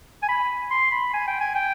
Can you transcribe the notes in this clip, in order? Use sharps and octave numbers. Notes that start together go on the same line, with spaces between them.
G#5
B5
C6
B5
G#5
G5
G#5
G5